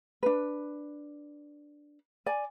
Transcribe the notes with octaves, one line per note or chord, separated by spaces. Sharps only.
D4 B4
D5 G#5